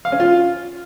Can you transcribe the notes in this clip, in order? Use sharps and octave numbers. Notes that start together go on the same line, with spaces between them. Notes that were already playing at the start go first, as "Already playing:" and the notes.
F5
C#4
F4